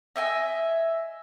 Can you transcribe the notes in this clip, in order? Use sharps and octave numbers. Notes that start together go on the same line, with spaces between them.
D#5 E5 G5 G#5